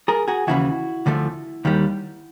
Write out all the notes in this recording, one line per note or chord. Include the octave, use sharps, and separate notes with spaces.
G#4 A#4
F#4 G#4
D#2 C#3 E3 E4 F#4
D2 D3 F3 A3
D#2 D#3 G3